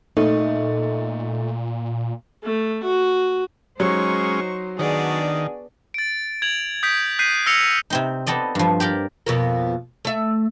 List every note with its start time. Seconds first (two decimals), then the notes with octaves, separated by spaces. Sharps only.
0.17 A#2 A3 D#4
2.43 A3
2.83 F#4
3.80 F#3 G#3 C#4 D#4 C5 C#6
4.79 D#3 B3 D4 F#4 G#4 D5
5.94 A6 D7
6.42 G#6 F7 F#7
6.83 D#6 G6 B6 D7
7.19 F#6 G6 B6 C7 D#7
7.46 E6 F6 A#6 C#7 F7
7.90 C3 C4 D#4
8.27 B3 C4 A4 D5 D#5
8.55 G2 F3
8.80 G4 A#4 D5 G5
9.26 F2 B2 A#3
10.05 A3 E5